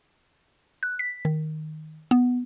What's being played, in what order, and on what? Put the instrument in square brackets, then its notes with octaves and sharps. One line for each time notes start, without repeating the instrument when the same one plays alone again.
[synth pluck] F#6
B6
D#3
B3